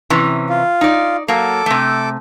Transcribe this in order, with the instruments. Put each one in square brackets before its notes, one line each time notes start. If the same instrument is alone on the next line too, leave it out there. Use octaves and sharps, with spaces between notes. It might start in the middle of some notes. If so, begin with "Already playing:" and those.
[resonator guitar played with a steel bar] C3 E3 C#4
[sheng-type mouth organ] F4
[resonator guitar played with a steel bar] D#4 D5
[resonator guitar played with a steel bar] F#3 A#3 [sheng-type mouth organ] A4 D6
[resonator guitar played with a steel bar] C3 A3